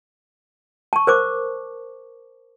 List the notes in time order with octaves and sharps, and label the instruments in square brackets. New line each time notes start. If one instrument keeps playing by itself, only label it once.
[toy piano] A5 C#6
A#4 C5 D6